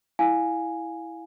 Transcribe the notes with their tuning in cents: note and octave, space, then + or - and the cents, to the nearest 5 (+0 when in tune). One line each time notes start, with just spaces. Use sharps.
E4 +0 F5 +20 G#5 +0